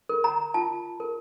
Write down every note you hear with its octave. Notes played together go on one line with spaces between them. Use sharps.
A#4
A#5
F4 A5
A#4